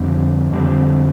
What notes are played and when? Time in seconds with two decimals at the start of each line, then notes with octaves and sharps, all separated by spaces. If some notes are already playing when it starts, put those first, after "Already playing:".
Already playing: F2 D3 G3 C4
0.52 F2 D3 G3 C4